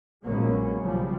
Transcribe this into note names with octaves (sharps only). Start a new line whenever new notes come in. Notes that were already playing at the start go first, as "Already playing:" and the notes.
A#1 F#3 G#3 A#3 B3 C#4
B1 C#3 F3 G3